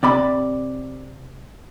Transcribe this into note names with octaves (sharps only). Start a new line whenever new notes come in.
C3 D5 B5